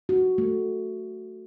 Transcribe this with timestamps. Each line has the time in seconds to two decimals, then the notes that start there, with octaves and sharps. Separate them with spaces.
0.09 F#4
0.38 A3